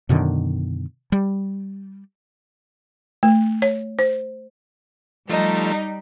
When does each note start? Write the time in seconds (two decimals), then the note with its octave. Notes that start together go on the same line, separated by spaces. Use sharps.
0.09 F#2 B2 D3 D#3
1.12 G3
3.23 A3
3.62 C#5
3.99 C5
5.30 F3 G3 A3 D#4